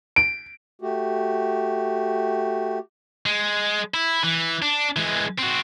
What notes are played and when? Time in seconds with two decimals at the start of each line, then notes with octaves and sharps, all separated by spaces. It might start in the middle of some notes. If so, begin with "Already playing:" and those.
0.16 D7
0.82 A3 F#4 G4
3.26 G#3
3.94 E4
4.23 E3
4.62 D4
4.97 E3 G#3
5.38 C4 F#4